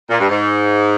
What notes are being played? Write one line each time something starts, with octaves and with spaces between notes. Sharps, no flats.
A#2
G2
G#2